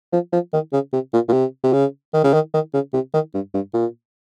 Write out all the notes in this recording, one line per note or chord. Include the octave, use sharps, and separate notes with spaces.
F3
F3
D#3
C#3
C3
A#2
A#2
C3
C3
C#3
D#3
C#3
D#3
D#3
C#3
C3
D#3
G2
G2
A#2